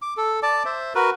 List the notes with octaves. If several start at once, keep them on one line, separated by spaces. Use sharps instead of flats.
D6
A4
D5 A5 D6
C5 E5
F#4 A#4 B4